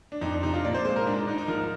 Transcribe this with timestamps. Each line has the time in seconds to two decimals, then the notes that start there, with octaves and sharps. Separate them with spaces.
0.12 D4
0.21 F2 D#4
0.33 D4
0.43 C3 D#4
0.54 F4
0.65 A#2 D5
0.74 C5
0.85 G#3 C5
0.96 A#4
1.06 G#2 D4
1.27 G#2 D#4
1.38 D#4
1.48 F3 A#4